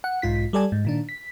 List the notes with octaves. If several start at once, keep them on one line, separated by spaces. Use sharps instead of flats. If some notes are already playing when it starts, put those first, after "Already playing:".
F#5
B1 G#2 F4 B6
G3 A4 D5 G#5
G#2
A#2 D#3 D4
B6